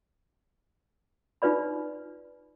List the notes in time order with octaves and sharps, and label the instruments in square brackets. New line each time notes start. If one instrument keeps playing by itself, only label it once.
[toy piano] D#4 F4 B4 D5 B5